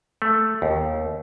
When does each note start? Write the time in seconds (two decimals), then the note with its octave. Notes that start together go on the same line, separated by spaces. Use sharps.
0.22 A3
0.62 D#2